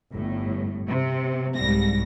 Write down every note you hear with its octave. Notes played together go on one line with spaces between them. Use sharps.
G1 A2
C3
C2 G#2 G3 A#6